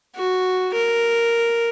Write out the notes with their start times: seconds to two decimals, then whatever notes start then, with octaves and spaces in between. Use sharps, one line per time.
0.16 F#4
0.75 A#4